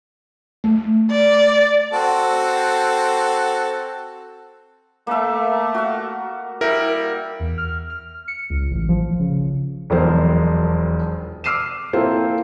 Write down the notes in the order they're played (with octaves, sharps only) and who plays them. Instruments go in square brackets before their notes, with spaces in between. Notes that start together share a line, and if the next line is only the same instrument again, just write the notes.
[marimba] A3
[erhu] D5
[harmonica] C4 F#4 A4
[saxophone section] A3 [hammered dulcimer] A#3 E5
[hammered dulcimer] F#4 F5
[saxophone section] G3 E4 [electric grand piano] A#4
[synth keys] E2
F6
F6
C#7
C#2
A1
F3
C#3
[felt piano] E1 B1 F2 A#4 C5
D6 E6 F6 C7 D#7 E7
A#3 C4 E4 F4 A4 C5